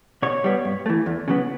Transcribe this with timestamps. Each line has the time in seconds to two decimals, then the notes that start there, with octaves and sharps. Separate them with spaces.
0.22 B2 C#5
0.44 G3 B3
0.65 G2
0.86 E3 A3
1.06 E2
1.28 C#3 F#3 B3